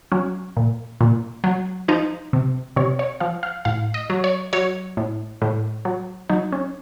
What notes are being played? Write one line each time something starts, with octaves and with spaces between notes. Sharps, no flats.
F#3 C#4
A#2
A#2
F#3
F3 D#4
C3
C3 C#5
C#5
F3 F5
F5
A2 F5
D#5
F#3
C#5
F#3 C#5
A2
A2
F#3
F#3 D#4
C#4